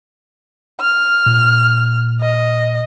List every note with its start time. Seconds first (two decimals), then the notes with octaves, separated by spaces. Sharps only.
0.81 F6
1.26 A#2
2.21 D#5